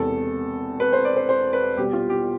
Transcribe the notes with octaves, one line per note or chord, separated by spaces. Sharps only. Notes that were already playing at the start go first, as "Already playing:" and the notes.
Already playing: E1 E2 C3 A4
B4
C5
D5
C5
C5
B4
C2 B2 G3 G4
F4
G4